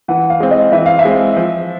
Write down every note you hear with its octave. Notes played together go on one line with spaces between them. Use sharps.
E3 F#5
F5
G#3 C4
D#5
E3 E5
F5
E5
G#3 C4
F3